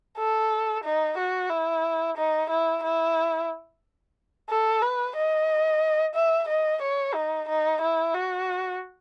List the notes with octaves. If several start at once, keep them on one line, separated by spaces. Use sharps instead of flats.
A4
D#4
F#4
E4
D#4
E4
E4
A4
B4
D#5
E5
D#5
C#5
D#4
D#4
E4
F#4